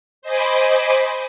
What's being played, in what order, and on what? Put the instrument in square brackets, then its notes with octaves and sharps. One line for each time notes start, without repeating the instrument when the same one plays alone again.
[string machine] C5 D#5 G#5 B5 D6